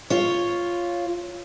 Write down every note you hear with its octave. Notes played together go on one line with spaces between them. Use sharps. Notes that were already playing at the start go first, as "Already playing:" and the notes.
F4 C#5